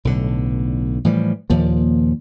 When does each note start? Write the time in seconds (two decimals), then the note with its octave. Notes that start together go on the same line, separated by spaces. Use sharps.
0.05 B1 A2 D3
1.05 A2 E3 F3 G3
1.50 D#2 A#2 F3